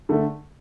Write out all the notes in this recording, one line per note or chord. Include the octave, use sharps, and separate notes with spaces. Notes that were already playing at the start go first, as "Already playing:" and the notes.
D3 A3